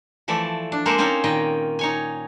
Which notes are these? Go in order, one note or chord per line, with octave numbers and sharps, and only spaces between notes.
E3 F3 A3 D5
D4
G#3 A#3 A4 A#4 C5 D5
A#3 C4 C#4 D#4 C5 C#5
A#2 D#3 D#5 G5
D#4 C#5 G#5